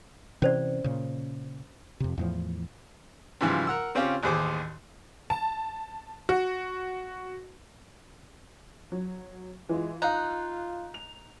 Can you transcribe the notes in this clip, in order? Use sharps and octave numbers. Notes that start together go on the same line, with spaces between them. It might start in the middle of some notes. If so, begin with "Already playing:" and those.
C3 E3 C#4 C5 D5
A#2 C#3
F2 C3
E2 A2 F3
G#2 C#3 E3 F3 G3
A#4 F#5 E6
C#3 C4 C#4 F4 G4
A1 D#2 G#4 C5 D6
A5
F#4
F#3
E3 G#3 F4
D#4 F4 F5 F#6
F7